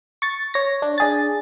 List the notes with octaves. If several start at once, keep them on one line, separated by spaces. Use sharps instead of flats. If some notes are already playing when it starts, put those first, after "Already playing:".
C#6 A6
C#5 A#6
D4
D4 G#4 A6